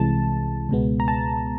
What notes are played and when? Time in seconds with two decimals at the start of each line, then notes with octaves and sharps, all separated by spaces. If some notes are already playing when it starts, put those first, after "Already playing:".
Already playing: C2 C3 E3 G#3 A5
0.69 C#2 B2 G#3 B3
1.00 A#5
1.08 A5